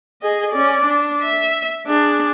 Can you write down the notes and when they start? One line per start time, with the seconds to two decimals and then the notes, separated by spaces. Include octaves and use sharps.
0.23 G#4 D#5
0.52 C#4 D5
0.85 D4
1.22 E5
1.87 D4 G#4